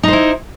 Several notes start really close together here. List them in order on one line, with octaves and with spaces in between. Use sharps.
D#4 C5 E4